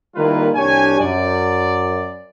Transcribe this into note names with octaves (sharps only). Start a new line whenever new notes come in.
D#3 G3 A#3 E4 F4 B4
C2 D4 G4 C#5 G#5
F#2 D5